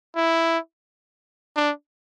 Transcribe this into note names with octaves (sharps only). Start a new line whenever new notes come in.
E4
D4